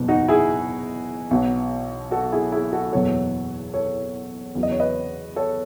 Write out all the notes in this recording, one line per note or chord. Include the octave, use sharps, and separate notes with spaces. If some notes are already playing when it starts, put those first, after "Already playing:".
Already playing: F#1 E2 B2
D#4 F#4
E4 G#4
B1 B2 F#3
F#4 A4
E4 G#4
E4 G#4
F#4 A4
F#1 E2 B2 F#3 A4 C#5
A4 C#5
E2 C#3 F#3
D#5
C#5
B4 D#5
A4 C#5